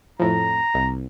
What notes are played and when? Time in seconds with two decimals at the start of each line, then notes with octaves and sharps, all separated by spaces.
0.19 F2 A2 A#5
0.74 C2